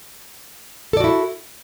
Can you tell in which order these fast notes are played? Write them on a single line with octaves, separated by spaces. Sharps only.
A4 D5 F#4 E4